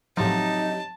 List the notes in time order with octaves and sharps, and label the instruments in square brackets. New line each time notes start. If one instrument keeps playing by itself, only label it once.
[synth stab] A2 F3 [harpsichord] C3 F#3 [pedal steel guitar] D#4 [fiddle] A5